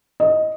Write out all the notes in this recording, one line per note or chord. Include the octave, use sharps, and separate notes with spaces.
D#5